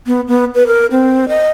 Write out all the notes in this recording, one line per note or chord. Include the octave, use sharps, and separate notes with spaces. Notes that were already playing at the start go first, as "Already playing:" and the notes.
B3
B3
B4
A#4
C4
D#5